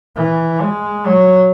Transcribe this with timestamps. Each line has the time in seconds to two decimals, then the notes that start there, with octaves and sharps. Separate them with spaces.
0.16 E3
0.61 G#3
1.06 F#3